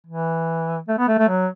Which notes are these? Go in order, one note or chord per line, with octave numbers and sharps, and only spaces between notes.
E3
A3
B3
A3
A3
F#3